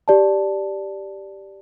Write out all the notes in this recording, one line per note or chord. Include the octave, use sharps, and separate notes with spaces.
G4 D5 A5